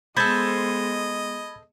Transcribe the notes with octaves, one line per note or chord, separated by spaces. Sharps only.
G#3 B3 A4 C5 D#5 B5 G#6 A6